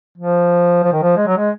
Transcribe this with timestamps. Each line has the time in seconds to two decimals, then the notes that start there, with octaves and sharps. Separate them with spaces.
0.18 F3
0.84 F3
0.93 D#3
1.03 F3
1.17 G#3
1.27 F#3
1.38 G#3